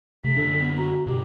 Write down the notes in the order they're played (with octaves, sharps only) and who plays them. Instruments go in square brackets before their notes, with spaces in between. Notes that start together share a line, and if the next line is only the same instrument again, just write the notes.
[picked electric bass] C3 [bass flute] A3 [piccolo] B6
[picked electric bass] F#2 D3 D4 [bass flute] A4
[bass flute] B3
[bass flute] F#4 [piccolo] A#5
[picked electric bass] G2 B2 [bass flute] G4